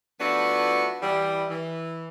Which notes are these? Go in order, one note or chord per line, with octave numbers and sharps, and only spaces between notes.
F3 A3 B3 D4 E4 F#4
E3 G3
E3